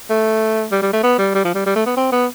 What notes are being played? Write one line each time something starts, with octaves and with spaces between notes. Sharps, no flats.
A3
G3
G3
A3
B3
G3
G3
F3
G3
G3
A3
B3
C4
B3